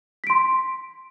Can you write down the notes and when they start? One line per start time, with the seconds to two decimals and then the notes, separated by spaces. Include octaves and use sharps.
0.24 B6
0.27 D7
0.30 C6